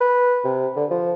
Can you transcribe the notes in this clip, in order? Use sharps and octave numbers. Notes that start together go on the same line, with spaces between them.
B4
C3
D3
F3